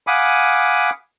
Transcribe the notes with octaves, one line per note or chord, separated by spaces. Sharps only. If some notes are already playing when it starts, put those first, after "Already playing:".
F5 F#5 G#5 B5 D6 D#6